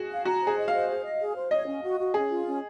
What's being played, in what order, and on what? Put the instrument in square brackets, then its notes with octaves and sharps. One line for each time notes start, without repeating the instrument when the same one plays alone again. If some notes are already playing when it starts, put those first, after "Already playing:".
Already playing: [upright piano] F#4 G#4
[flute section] F5
[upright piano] F#4 [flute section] A#5
[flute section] C5
[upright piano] G#4
[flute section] D#5
[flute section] C5 [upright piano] F5
[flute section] G#4
D#5
G#4
C5
[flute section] C#5 [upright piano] D#5
[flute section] C#4
F#4
F#4
[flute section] C#4 [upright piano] G#4
[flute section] F4
C#4